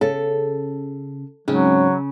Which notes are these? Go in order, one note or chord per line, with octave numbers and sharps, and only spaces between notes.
C#3 A4
G#2 C#3 F#3 C4 C#4